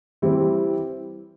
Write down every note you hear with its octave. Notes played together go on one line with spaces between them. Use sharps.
E3 G3 C4 E4 G4